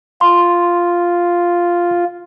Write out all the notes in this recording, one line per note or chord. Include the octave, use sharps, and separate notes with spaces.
F4 C6